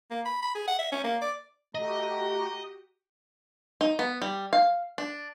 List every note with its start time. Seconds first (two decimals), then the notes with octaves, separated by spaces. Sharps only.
0.10 A#3
0.25 B5
0.42 B5
0.55 G#4
0.67 F#5
0.79 E5
0.92 C#4
1.04 A#3
1.21 D5
1.75 A3 F#4 G4 D#5 A#5
3.81 D#4
3.99 B3
4.22 G3
4.53 F5
4.98 D4